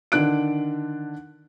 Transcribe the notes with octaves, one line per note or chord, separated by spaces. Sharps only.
D3 D#3 D4 F#6 D7